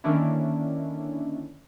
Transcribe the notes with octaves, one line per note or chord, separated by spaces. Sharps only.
D3 D#3 A#3 C#4 D4 E4